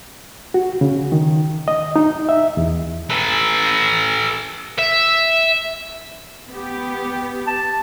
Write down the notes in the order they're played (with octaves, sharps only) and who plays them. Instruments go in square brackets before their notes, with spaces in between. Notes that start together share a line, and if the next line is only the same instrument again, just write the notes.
[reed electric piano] F#4
C#3
D#3
D#5
D#4
E5
E2
[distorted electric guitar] A4 B4
E5
[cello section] B3 G4
[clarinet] A5